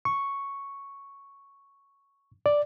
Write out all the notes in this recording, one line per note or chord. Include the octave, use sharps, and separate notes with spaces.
C#6
D5